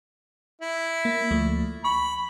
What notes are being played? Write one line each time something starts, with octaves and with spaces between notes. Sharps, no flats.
E4
A#3
D2 F3 A3
B5 C#6